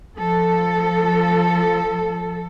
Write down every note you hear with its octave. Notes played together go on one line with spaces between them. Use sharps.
F3 A4